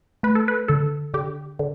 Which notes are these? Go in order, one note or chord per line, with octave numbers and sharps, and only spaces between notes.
A3 B4
A4
B4
D3 A4
D3 G4
D3